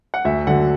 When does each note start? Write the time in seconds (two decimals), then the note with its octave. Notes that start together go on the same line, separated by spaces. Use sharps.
0.14 F#5
0.25 D2 E5
0.47 D3 F#3 F#5